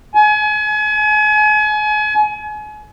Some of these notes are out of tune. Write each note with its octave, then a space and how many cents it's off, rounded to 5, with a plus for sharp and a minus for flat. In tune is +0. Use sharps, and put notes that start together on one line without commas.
G#5 +35